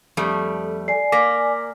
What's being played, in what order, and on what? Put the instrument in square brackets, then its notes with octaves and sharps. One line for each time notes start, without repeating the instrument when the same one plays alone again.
[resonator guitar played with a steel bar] F2 G3 A3
[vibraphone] D5 G#5 [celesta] C7
[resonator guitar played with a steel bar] A#3 [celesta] D6 A#6 B6